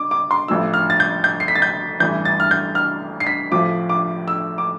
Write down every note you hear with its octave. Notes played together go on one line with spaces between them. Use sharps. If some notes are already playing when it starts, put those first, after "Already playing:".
Already playing: D6
D6
C6
A1 A2 F3 E6
F6
A6
G6
G6
C7
B6
A6
G6
A1 G2 E3 G6
A6
F6
G6
F6
C7
B6
A1 A2 F3 D6
D6
E6
D6